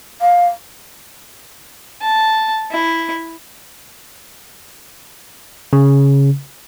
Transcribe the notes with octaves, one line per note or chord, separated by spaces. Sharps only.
F5
A5
E4
C#3